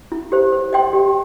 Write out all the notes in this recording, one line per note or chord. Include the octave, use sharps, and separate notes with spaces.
E4
G4 C5
C5
D#5 G5 C6
G4